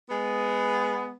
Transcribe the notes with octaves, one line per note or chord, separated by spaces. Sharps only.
G#3 B3